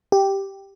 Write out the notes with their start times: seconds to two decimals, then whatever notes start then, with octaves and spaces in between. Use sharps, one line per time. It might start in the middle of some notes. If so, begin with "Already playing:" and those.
0.12 G4